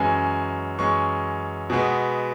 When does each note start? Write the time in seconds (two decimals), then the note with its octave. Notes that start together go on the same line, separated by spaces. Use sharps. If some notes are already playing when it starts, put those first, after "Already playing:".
Already playing: F#2 E3 G#3 C#4 G#5
0.78 F#2 E3 G#3 C#4 C#6
1.70 B2 G#3 B3